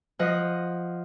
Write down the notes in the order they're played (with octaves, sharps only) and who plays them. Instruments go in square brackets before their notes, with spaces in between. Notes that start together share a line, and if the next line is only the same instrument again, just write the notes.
[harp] F3 D#5 F#5